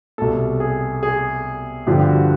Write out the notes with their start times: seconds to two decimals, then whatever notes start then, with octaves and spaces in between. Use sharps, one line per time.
0.18 C2 B2 A4
0.60 G#4
1.03 G#4
1.87 G2 D3 F3 G4
1.99 G4
2.09 F#4